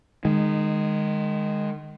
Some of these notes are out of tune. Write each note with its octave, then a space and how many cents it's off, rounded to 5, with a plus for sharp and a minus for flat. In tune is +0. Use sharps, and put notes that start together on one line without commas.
D#3 -20 G#3 +0